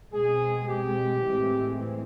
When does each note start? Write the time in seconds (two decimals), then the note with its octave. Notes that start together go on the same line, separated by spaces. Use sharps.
0.13 B2 G#3 C4 G#4
0.68 G4
1.23 A2 E3 G#3 C4